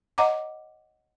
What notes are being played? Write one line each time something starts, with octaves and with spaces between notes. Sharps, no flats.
C#5 D#5 F#5 A#5 D6